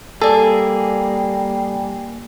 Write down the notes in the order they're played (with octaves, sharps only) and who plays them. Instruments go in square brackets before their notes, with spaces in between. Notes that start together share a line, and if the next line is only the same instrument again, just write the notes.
[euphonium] G3 [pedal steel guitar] A#3 G#4 [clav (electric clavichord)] A4 [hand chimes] D5 G#5